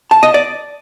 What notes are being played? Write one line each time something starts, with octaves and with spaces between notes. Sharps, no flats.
A5
D#5
D5